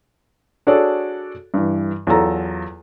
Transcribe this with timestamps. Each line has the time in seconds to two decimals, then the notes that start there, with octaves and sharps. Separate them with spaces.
0.67 D4 F#4 G#4 A4 C#5 D5
1.54 G2 E3
2.07 E2 F#3 F4 A4 A#5